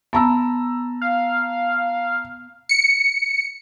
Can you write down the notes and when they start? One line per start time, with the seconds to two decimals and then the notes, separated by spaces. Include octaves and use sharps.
0.13 B3 A5 A#5 E6
1.01 F5
2.69 C#7